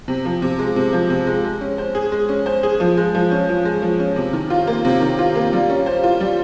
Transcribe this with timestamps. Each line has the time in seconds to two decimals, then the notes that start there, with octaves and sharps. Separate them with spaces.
0.08 C3
0.25 F3
0.42 C3
0.59 G#3
0.76 C3
0.93 F3
1.10 C3
1.27 G#3
1.44 G#3
1.61 C#4
1.78 C5
1.95 G#4
2.12 G#3
2.29 C#4
2.46 C5
2.63 G#4
2.80 F3
2.97 G#3
3.15 F3
3.31 C#4
3.49 F3
3.65 G#3
3.82 F3
3.99 C#4
4.16 C3
4.33 D#3
4.50 F4
4.67 A#3
4.85 C3
5.01 D#3
5.19 F4
5.35 A#3
5.53 G3
5.69 C#4
5.86 C5
6.04 F4
6.20 G3